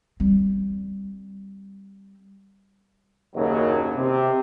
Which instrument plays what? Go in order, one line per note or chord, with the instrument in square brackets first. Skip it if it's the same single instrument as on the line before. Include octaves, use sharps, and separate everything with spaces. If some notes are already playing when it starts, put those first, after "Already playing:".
[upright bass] G3 C4
[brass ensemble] F#1 D#2 B2 F#3
C3